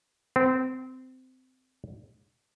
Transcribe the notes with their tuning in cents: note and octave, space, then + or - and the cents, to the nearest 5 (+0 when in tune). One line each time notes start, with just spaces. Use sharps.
C4 -20